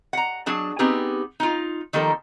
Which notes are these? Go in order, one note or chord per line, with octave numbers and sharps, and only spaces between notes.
F#5 A#5
F#3 D4 G#4 A5
B3 C4 D#4 G4 G#4
D#4 F4
D#3 F3 G3 A#3 A4 A#4